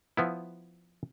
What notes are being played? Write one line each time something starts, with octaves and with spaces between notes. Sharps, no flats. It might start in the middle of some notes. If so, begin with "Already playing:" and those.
F3 B3 E4